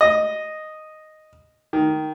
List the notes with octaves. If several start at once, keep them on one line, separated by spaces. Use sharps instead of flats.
D#5
D#3